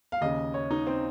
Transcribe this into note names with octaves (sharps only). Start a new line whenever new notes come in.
F5
D#2 C#3 D#5
C#5
D#4
C4